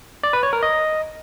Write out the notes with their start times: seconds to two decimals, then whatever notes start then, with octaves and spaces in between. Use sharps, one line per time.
0.23 D5
0.33 B4
0.43 C#5
0.53 A#4
0.63 D#5